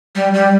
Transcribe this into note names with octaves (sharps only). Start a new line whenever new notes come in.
G3
G3